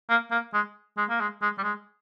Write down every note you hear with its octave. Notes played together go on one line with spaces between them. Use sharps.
A#3
A#3
G#3
G#3
A#3
G#3
G#3
G3
G#3